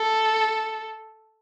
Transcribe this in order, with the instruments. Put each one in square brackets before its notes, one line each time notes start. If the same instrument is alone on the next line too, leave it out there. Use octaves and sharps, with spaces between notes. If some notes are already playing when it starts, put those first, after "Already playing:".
Already playing: [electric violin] A4